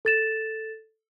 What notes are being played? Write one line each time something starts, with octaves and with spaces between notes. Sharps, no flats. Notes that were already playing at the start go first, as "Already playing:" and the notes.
A4 A6 E7